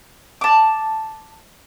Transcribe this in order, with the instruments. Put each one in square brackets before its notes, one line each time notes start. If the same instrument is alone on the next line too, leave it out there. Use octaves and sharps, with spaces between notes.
[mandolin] A5 D6